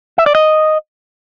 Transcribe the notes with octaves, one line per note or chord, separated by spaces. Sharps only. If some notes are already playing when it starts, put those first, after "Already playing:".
E5
D5
D#5